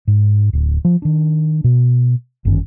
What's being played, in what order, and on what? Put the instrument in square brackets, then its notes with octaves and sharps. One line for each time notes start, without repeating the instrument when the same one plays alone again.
[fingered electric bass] G#2
D1
F3
D#3 D4
B2
G1 F#2 D#3 C#4